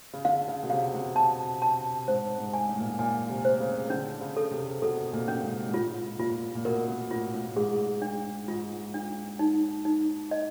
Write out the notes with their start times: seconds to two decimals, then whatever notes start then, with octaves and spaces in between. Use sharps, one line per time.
0.13 C#3
0.25 D3 F5
0.48 C#3
0.63 B2
0.70 C3 F5
0.94 B2
1.16 A5
1.62 A5
2.08 G#2 C5
2.38 G#2
2.53 G#5
2.69 A2
2.78 A#2
2.88 A2
2.99 A#2 G#5
3.29 C3
3.45 C5
3.60 C#3
3.90 D3 C#4
4.21 C#3
4.37 A4
4.51 C3
4.82 B2 A4
5.13 A#2
5.28 C#4
5.43 G#2
5.68 G#2
5.73 A2 F4
6.19 A#2 F4
6.55 A#2
6.65 B2 A#4
6.88 B2
7.11 A2 F4
7.33 A2
7.46 A2
7.56 G#2 G#4
8.02 D4
8.48 G#2 F4
8.94 D4
9.39 D#4
9.85 D#4
10.31 D#5